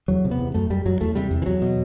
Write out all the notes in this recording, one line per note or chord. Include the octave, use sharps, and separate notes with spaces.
E2 F#3
C3
B3
E2
F#2 A3
F#2 G3
F#2 F#3
E2 A3
C3 G3
E2
E3
E2 F#3
B2